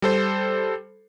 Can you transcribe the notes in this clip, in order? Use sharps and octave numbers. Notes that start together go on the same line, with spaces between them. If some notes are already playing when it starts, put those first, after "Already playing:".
G3 A4 C5